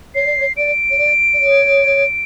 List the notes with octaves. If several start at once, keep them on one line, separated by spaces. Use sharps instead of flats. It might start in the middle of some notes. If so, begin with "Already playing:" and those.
C#5 C7
D5
C#5
D5 D7
C#5
D5
D5
C#5